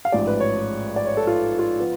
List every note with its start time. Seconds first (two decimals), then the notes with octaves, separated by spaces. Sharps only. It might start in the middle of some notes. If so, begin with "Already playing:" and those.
0.05 F5
0.12 A1 G#2 F3 D5
0.27 B4
0.40 C#5
0.96 D5
1.06 C#5
1.17 A4
1.27 F4
1.59 F4
1.80 F3 B3